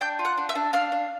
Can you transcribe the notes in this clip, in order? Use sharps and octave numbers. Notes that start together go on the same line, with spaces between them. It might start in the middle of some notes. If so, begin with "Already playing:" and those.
D4 G5 G6
F4
F#5 F#6
D4
E5 E6
D4
D4 F5 F6
D4